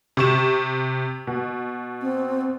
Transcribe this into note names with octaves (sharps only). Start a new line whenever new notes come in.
C3 C#6 E7
B2
C4